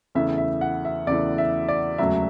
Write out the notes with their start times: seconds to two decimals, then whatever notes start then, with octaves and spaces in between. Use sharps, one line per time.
0.15 E2 C#3 E3 A3 E5
0.38 E5
0.61 F#5
0.85 E5
1.07 E2 C#3 E3 A3 D5
1.38 E5
1.69 D5
1.98 E1 D2 C#3 F#3 A3 E5